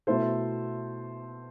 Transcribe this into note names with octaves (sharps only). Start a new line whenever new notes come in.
B2 A3 E4 A4 C5